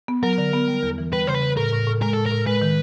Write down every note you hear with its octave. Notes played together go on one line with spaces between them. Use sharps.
B3
F#3 A#4
D3
B3
G3
E2
E3
G3 B4
C#3 C5
B4
C#3
A2 A#4
A2
A2
G#3 A#4
A2 A4
A#4
A2
G#3 B4
D#3